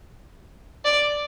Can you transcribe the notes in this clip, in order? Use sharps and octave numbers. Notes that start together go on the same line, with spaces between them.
D5